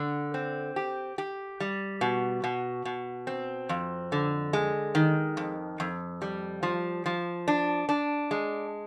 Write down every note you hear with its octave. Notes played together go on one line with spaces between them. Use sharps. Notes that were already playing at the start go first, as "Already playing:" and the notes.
Already playing: D3
C4
G4
G4
G3
B2
B2
B2
C4
F2
D3
G#3
D#3
F2
F2
G3
F3
F3
D4
D4
G#3